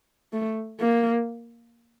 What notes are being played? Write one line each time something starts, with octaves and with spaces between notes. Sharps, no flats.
A3
A#3